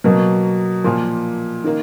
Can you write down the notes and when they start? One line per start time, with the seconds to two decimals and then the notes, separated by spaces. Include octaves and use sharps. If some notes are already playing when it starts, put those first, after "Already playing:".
0.04 B2 F#3 A#3
0.84 A#2 F3 A#3
1.64 D#3 A#3